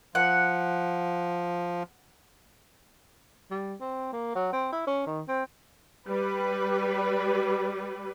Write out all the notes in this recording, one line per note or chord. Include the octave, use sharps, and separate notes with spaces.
F3 F#5
G3
C4
A#3
F#3
C4
E4
C#4
D#3
C4
G3 B4